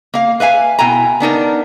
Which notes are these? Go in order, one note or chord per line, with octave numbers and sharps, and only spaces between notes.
A#3 F5
B4 E5 F5 G#5
B2 E4 G5 G#5 A#5
B3 D4 D#4 A#4